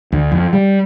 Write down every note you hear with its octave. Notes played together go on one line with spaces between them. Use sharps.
D2
F2
G3